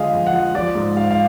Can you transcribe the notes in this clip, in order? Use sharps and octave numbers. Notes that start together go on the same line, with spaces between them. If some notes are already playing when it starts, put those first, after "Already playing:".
Already playing: D3 F3 G#3 G#4 D#5 F5
F2
F#5
F3
F3 D5
G#2
G#2 F5
F5